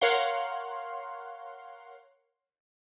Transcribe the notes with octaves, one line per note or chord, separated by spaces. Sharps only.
A#4 C#5 F5 F#5 C6